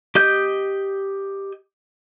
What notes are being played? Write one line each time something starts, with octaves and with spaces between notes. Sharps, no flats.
G4 D#5 G6